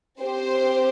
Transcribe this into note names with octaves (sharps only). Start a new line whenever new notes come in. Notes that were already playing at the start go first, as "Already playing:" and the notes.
C4 G4 C5